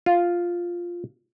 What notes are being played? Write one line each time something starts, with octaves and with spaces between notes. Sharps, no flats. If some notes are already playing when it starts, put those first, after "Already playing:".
F4